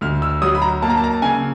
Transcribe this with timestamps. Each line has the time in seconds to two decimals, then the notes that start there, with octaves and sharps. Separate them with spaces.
0.01 D2 F6
0.22 E6
0.42 F#3 D#6
0.55 B5
0.62 A#5
0.82 A#3 A5
0.90 A#5
0.97 A5
1.04 A#5
1.12 A5
1.22 C#3 G#5